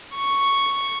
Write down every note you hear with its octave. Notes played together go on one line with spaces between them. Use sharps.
C#6